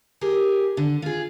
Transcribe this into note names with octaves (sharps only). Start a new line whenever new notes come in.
G4 G#4 A#4
D3
F4 G#4